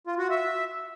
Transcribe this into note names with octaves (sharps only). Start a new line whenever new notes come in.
F4
F#4
E5